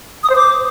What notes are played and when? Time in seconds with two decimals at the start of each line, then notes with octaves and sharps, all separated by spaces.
0.24 D#6
0.30 C5
0.36 D6